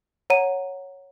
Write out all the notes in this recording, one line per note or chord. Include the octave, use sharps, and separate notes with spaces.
C#5 F#5 A#5 D#7